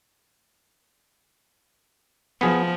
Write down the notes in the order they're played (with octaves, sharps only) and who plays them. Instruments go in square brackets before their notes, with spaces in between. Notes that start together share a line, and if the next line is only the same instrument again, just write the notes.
[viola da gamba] F3 [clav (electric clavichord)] B3 G#4